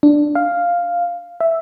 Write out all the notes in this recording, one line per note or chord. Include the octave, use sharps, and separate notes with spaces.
D4
F5
E5